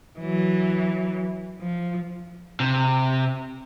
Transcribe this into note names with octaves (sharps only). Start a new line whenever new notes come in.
E3 F#3
F3
C3